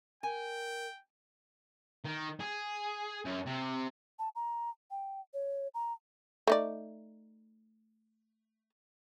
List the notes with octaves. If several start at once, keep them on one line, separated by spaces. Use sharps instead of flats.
A#4 G5 G#5
D#3
G#4
F#2
C3
A5
A#5
G5
C#5
A#5
A3 D#4 D5